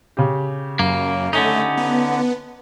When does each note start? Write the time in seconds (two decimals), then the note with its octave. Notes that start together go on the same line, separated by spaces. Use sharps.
0.17 C#3 G4
0.79 F#2 A#3
1.33 D3 A3 C#4 D#4
1.77 B3